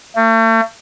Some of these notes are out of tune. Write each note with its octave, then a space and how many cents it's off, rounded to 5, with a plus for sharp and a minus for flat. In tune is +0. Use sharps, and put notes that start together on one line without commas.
A3 +40